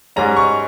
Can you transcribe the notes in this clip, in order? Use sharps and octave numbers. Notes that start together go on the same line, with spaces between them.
G#2 G3 C#4 A#5
C#6